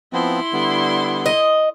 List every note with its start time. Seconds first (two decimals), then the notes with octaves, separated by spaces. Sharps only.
0.13 F3 B3 C4 E4 C6
0.53 D3 G3 B3
1.26 D#5